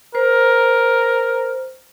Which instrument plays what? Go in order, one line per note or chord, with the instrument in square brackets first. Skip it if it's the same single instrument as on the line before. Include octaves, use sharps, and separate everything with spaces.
[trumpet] A#4 [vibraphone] C5